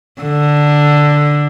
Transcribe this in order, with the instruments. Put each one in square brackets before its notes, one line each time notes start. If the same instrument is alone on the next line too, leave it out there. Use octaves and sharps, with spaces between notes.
[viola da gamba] D3